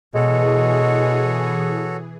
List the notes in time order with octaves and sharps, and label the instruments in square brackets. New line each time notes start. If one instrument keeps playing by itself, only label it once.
[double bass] B2 [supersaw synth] E3 G#4 [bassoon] G#3 [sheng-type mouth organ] F#4 A4 C#5